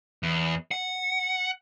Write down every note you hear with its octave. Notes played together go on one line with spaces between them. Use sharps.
E2
F#5